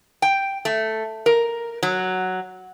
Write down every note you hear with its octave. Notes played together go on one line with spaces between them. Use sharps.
G5
A3
A#4
F#3